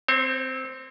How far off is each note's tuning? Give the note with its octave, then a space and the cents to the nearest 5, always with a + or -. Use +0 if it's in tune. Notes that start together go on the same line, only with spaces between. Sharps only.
C4 -5 C#5 -45